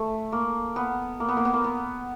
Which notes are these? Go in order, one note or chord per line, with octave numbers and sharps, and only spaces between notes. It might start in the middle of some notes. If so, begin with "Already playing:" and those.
Already playing: A3
A#3
B3
A#3
B3
A#3
B3
A#3
B3